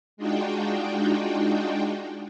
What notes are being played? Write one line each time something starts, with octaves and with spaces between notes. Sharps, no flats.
G#3 D4 D#4 F4 F#4 G5